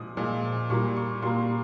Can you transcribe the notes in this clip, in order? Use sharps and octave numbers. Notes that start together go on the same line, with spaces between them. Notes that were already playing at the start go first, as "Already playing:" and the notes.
Already playing: A#2 F3 G#3 D#6
A#2 F3 G#3
A#2 G3 A#3 C#6
C#6
A#2 G3 A#3 C6